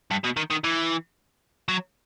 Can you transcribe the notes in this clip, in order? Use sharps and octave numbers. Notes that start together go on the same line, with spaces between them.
G2
B2
D#3
D#3
E3
F#3